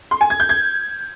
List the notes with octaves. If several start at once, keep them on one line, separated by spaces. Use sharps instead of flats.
C6
G#5
G#6
G6
G#6